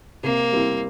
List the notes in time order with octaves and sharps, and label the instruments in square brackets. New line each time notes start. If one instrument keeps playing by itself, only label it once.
[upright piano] C3 [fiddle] A#3
[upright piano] G3 C4 E4